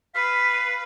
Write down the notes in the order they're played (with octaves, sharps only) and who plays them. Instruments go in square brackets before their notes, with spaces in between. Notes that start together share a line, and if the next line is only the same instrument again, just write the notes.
[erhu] B4 [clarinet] F5 [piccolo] B6